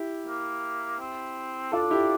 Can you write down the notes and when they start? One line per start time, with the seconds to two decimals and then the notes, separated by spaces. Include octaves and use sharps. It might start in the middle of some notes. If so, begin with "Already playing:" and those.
Already playing: E4 G4
0.27 A#3
0.99 C4
1.72 D4 F4 A4
1.90 E4 G4